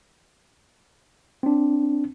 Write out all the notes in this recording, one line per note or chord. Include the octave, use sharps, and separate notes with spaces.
C4 D4